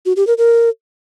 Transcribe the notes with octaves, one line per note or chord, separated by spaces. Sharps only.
F#4
G4
A#4
A#4